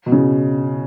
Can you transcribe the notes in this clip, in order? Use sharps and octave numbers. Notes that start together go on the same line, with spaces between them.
B2
C#3